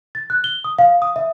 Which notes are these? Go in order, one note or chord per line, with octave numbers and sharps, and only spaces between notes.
A6
F#6
G7
D#6
F5
D#6
E5